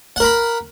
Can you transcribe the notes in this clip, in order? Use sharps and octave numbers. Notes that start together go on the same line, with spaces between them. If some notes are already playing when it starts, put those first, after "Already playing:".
A#4 F#5 B5